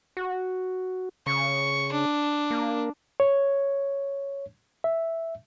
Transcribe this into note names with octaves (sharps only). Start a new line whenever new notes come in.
F#4
C#3 C#6
D4
A#3
C#5
E5